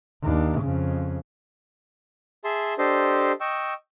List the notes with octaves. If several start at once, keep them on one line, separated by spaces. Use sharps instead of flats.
D#2 D4
F2 C#3
G#4 E5 A5 C6
D4 G4 A4 C5 D#5 C6
D#5 G5 C#6 E6